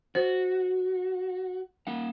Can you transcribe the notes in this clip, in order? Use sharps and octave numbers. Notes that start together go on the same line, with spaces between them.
F#4 C5
A#3 F#5